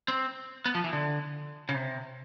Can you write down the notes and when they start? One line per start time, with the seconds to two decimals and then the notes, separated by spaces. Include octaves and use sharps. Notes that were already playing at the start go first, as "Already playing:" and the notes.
0.08 C4
0.66 B3
0.75 F3
0.84 E3
0.93 D3
1.69 C#3
1.74 C3